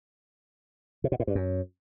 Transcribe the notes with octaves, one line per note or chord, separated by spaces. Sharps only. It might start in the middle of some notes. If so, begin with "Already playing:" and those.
C3
B2
A2
G2
F#2